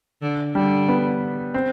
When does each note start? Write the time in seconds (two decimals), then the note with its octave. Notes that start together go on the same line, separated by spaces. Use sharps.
0.22 D3
0.55 D3 G3
0.88 B3
1.54 C4